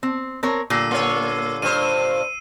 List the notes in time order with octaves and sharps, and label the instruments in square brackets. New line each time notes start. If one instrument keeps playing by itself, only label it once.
[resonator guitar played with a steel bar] C4
C4 A#4 C#5
[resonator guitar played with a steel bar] A#2 D3 G3 [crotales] E6 C7 D#7
[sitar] A#3 C#5
[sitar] G2 C5 [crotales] D#7